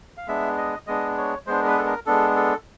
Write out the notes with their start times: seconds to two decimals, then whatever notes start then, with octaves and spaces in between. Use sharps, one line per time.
0.17 F5
0.27 G#3 B3 D4 E5
0.58 D#5
0.87 G#3 B3 D4 D#5
1.17 C#5
1.46 G#3 B3 D4 C5
1.62 A#4
1.66 B4
1.78 A4
1.86 A#4
2.06 G#3 B3 D4 A4
2.36 A4